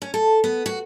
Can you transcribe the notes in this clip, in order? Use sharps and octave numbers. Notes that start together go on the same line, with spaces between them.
C#4
A4
B3
F#4